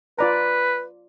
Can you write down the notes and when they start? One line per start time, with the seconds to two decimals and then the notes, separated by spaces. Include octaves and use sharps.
0.19 F4 B4 D5 A#5